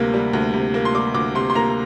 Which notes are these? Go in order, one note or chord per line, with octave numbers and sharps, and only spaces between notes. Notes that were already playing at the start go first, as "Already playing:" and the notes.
Already playing: D2 C3 G3 A#3
G3
D2
C3
A#3
C6
G3 D6
D2 D6
C3 C6
C6
A#3 A#5